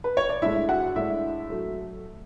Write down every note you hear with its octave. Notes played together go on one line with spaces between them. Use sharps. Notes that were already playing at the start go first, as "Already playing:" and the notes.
B4
C#5
D5
A2 G#3 D4 E4 E5
F#4 F#5
A2 G#3 D4 E4 E5
F#3 A3